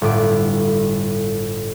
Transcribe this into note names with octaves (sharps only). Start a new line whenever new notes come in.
G1 A2 D6